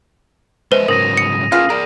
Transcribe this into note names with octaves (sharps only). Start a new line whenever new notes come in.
G#3 B4 C5 D#5 E5 D#7
G#2 C#3 F#3 A#4 D#6 A#6 D#7
C#7
B3 C#4 F4 G#4 A#4 F5
G#4 A#4 D5